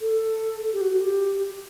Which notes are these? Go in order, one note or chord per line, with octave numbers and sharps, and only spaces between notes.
A4
G4
F#4
F#4
G4